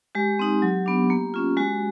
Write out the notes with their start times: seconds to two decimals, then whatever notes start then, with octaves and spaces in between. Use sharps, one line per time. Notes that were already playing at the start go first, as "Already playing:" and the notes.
0.15 G#3 G4
0.39 C4 D#4
0.62 F#3
0.86 B3 D4
1.10 A#3
1.34 C#4 F4
1.57 G#3 F#4